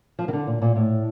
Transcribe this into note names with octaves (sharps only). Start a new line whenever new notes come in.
F3
D#3
D3
A#2
A#2
A2